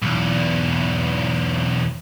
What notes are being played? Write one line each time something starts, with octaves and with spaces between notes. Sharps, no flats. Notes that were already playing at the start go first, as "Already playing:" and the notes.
B1 E2